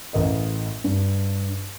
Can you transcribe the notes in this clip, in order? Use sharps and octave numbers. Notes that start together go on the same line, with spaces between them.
A1 A#4 D#5
G2